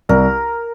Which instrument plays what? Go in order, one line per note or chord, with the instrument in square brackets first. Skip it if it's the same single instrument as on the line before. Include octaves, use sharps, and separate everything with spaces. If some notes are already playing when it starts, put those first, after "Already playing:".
[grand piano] C2 [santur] A#4